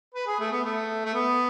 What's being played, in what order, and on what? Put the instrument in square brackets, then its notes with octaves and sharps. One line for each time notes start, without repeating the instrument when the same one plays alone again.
[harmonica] B4
G#4
A3
B3
A3
A3
B3